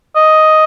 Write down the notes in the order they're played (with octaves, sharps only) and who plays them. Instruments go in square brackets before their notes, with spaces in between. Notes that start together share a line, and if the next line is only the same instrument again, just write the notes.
[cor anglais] D#5